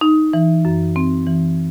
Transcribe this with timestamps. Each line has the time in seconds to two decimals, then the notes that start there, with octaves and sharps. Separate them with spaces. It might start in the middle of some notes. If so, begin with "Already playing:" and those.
0.01 D#4
0.33 E3
0.65 F#2
0.96 C4
1.27 E3